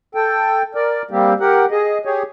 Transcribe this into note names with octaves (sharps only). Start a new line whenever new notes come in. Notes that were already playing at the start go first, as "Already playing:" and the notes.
A4 G5
A#4 D5
G3 A#3 C4 G4
G4 A#4 F#5
G#4 D#5
G4 G#4 C#5